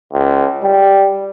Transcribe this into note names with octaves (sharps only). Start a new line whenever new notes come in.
C#2
G3